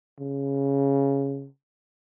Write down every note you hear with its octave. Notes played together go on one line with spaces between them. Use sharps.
C#3